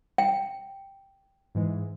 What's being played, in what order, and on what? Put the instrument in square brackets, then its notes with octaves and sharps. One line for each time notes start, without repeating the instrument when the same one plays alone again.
[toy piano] G5
[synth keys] G#2 E3 G#3